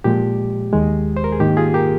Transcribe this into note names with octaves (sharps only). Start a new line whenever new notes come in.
A#2 F3 G#3 G4
D#2 D#3 G#3
C5
A#4
G#4
G#2 D#3 A#3 G4
F4 G#4
G4 A#4